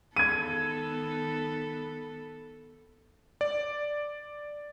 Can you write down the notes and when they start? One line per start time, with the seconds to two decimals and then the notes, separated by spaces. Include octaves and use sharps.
0.16 D#3 B3 A4 G#6 D#7
3.41 D5